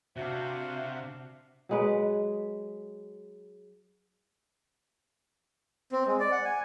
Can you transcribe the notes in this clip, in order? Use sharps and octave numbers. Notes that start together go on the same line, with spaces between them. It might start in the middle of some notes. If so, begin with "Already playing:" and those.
C3 C4 D4 F#4 E5 F5
F#3 G#3 B4
C4
G#3
D5
F#5
G#5